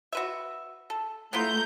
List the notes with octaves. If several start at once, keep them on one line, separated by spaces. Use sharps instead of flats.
F#4 B4 E5
A4
A3 B3 E4 F4 A#5 G6